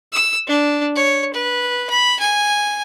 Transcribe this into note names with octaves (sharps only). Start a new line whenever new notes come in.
E6
D4
C#5
B4
B5
G#5